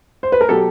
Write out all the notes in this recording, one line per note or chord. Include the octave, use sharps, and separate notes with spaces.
C5
B4
A#4
B2 F#3 G4 A4